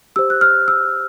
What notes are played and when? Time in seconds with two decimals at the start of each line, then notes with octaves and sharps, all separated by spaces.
0.16 G4 C5 E6
0.30 F#6
0.41 F6
0.68 E6